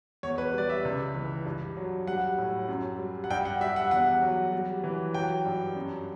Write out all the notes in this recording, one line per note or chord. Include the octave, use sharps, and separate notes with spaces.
E2 C#5
B4
G3 D5
E5
C#2
E3
G2
F#3
G3 F#5
A2
F#2
G3
F#5
G2 G5
F#5
G3 E5
F#5
E2 F#5
F#3
G3
E3
F#3 G5
G2
F#2